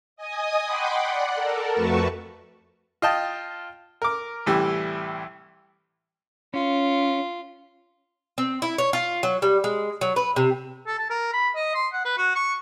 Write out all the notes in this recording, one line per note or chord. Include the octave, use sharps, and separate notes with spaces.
D#5 G#5 D#6
F#5 G5 B5 C6 D6
D5 F#5
A4 A#4
F2 A3 F#4 B4 A5 C#6
F4 D#5 G5 A5
A#4 D6
C2 A2 E3 G3
C#4 F4
C4
E4
C#5
F4
F#3
G3
G#3
F#3
B4
C3
A4
A5
A#4
B5
D#5
C6
F#5
B4
F#4
C#6